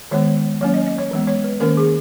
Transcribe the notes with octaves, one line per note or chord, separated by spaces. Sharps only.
D#3 G#3 B3 C#5
F#3 A#3 C#4 C#5
D#5
D#5
C#5
E3 G#3 B3
C#5
B4
D#3 A#3 C#4 A#4
G#4